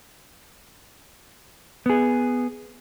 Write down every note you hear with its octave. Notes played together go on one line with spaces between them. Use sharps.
B3 G#4